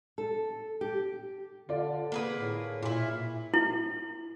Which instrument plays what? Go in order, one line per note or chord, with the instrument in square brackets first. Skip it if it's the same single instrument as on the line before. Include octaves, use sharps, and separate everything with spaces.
[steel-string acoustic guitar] A4
G4
[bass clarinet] D3 [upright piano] F4 D5
[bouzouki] A#3 G#4 B4
[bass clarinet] A2
[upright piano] A#2 [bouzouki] E4 F4
[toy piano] E4